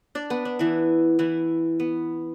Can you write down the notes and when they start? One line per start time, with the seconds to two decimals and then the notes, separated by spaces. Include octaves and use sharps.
0.15 D4 D5
0.30 B3 B4
0.45 D4
0.59 E3 E4
1.19 E3 E4
1.80 B3